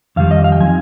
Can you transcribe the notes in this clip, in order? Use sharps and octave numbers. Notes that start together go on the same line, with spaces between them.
F2 D#3 G3 F5
D#5
F5
G5
F3 C4 D#4 G#5